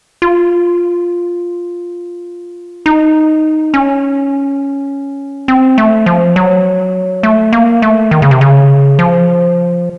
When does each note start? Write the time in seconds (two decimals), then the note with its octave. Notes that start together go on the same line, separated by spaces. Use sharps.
0.22 F4
2.86 D#4
3.74 C#4
5.48 C4
5.78 A3
6.06 F3
6.36 F#3
7.23 A3
7.53 A#3
7.82 A3
8.11 D#3
8.22 C#3
8.31 C3
8.41 C#3
8.99 F3